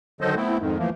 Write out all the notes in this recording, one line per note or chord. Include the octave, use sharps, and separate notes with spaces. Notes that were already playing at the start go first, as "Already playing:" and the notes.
D3 D#3 F#3 A4 C5 D#5
A3 B3 C4 E4
F2 G#2 D#3
E3 F3 A3 A#3